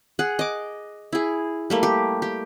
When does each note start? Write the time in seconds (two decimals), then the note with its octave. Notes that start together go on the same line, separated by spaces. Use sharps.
0.19 G#4 F#5
0.39 D#5 D6
1.13 E4 G#4
1.70 G3 A3 A#3
1.83 G4
2.22 G4